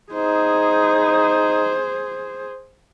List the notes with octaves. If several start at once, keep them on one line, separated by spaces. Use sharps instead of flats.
D#4 G#4 C5